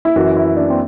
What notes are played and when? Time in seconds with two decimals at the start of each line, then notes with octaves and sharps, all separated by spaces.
0.05 E4
0.16 F#2 E3 F#4
0.37 E4
0.56 D4
0.70 C4